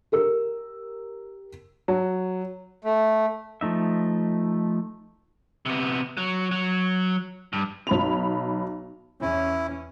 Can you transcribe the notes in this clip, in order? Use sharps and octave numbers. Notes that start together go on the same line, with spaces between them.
G4 A#4 E6
F#3
A3
F3 A3 D#4 E5
C3 B3
F#3
F#3
G2
B1 B5 F7
E2 C#4 E4